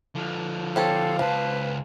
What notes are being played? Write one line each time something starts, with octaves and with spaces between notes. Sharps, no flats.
D3 F3
C4 G4 A4 C5 C#5 F5
C#2 F3 B4 A5